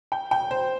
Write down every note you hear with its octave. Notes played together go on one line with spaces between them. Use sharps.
G5
G5
C5